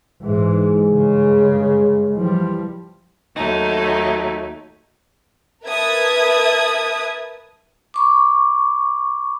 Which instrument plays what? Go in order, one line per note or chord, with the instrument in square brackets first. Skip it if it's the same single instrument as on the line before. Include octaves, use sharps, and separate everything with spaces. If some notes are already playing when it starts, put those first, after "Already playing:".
[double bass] G#2 E3 [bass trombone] G#3
[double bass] G2 C#3
[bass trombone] E3 [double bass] F3 G3
[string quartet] D#2 F#3 A3 D#4
[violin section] A#4 B4 E5 A5 D#6 G#6
[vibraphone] B5 C#6 D6